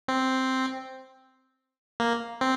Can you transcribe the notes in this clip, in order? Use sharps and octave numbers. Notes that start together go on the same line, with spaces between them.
C4
A#3
C4